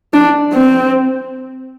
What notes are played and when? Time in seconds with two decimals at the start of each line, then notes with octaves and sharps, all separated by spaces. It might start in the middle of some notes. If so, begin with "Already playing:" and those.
0.13 D4
0.53 C4